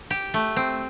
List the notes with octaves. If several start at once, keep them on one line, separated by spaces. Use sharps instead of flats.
G4
A3
C4